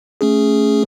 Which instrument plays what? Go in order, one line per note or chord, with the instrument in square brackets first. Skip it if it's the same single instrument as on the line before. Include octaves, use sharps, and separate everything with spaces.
[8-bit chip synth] A3 C#4 G#4